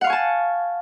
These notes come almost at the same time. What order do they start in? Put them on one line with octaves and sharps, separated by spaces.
F#5 F5 C#6 G#5 A5